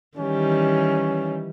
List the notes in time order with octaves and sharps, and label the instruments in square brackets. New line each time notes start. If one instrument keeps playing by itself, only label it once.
[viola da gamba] D#3 E3 G3 [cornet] C#4